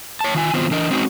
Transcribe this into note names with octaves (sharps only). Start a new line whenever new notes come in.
C#5 A5
D#3 F4 G#5
D#3 F#3 B3 C4 F4 C5
E3 D4 A#4 D#5
G#3 C4 C#4 D#4 F#4